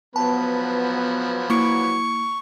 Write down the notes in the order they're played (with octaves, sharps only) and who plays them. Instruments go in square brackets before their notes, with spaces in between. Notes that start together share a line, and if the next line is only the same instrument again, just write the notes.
[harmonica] F3 F#3 B4 [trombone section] B3 [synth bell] A5
[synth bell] A#3 E4 [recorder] C#6